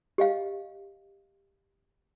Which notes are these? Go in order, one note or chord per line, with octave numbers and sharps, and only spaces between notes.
G4 D#5 F5